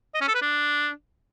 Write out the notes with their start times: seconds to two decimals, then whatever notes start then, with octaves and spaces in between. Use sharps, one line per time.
0.14 D#5
0.21 C#4
0.28 A4
0.35 B4
0.42 D4